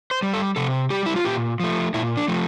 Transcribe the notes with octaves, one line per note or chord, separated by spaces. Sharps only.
C5
G3
A4
C3 A4
G3 G4
E4
F4
A#2 G4
F3 A3
A#2 E4
D4
F3 A3